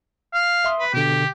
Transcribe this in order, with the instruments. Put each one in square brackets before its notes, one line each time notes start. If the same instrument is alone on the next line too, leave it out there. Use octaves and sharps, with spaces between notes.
[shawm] F5
[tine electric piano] E5 C6 D#6
[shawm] B4
[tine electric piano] B2 D3 [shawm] G4